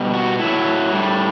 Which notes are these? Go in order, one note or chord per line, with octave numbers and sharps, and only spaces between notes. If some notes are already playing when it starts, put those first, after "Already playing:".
Already playing: B2 G3
F#4
A2 F#3 E4
A2 G3